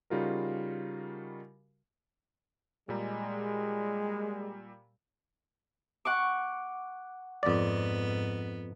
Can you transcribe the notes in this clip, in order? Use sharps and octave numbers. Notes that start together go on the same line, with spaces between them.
C#3 G3 D#4 F4 F#4 A#4
A#2 G3 G#3 A#5
F#5 C#6 D6
F2 G#2 B3 D5